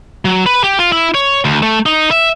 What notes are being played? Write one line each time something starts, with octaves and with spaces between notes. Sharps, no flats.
F#3
B4
G4
F4
E4
C#5
D2
A3
D#4
E5